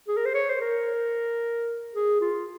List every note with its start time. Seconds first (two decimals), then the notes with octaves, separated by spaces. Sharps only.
0.08 G#4
0.17 A#4
0.26 C5
0.34 C#5
0.50 C5
0.61 A#4
1.95 G#4
2.21 F4